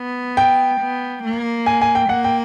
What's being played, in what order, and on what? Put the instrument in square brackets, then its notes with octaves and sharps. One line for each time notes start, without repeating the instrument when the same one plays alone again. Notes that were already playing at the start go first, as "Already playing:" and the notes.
Already playing: [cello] B3
[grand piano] G5
[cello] B3
A#3
[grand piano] G#5
G#5
G5
[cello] A#3 [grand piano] F#5
[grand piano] G5